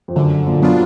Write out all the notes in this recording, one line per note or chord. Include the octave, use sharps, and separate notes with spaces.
F2
F#2 D3
A#2
F#3 B3 D4 F4